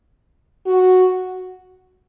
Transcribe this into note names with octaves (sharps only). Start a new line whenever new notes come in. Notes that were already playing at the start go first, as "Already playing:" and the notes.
F#4